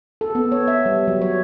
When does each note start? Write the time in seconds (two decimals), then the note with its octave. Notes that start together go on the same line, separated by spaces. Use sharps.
0.21 A4
0.35 B3
0.52 C#5
0.68 E5
0.86 G3
1.08 F#3
1.22 C#5